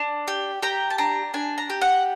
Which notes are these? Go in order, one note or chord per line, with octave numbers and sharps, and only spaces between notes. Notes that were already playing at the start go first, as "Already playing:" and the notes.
Already playing: D4
G4
G4 A#5
A5
D4 A#5
D4 G#5
A#5
G4
F#5